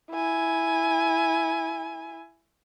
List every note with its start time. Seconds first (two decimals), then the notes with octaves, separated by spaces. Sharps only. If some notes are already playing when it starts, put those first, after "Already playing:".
0.11 E4 G#5